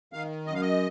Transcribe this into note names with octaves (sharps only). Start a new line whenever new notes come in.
D#3 F5
F#2 D#5
F5
D#5